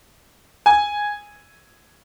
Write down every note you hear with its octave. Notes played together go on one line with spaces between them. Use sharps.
G#5